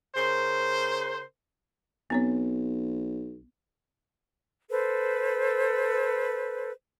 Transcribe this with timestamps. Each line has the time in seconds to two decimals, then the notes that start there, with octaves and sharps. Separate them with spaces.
0.16 C#3 A#4 C5
2.10 B1 B3 C4 C#5
4.70 A4 B4 C5